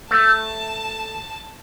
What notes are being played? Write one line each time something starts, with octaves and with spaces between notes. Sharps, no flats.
A3 A5